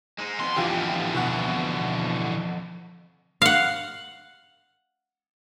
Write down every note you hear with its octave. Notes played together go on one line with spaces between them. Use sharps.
G#3 D#4
F2 B3 C6
D3 E3 F4 G4
B2 F#5
F5 F#5